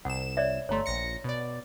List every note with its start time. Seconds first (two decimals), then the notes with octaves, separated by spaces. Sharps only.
0.05 C2 F#5 E7
0.37 C#5 D5 E5
0.69 G1 A3 C#5 A#5 C6
0.86 A#1 A#6 C#7
1.24 B2 D5